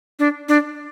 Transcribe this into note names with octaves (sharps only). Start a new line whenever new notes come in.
D4
D4